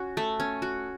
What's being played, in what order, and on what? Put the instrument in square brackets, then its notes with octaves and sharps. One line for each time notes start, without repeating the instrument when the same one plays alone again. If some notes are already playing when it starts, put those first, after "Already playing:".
Already playing: [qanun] C#4 F#4
A3
C#4
F#4